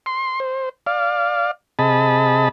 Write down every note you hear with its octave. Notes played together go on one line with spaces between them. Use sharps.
C6
C5
D5 F5
C3 G#4 D#5 A5 B5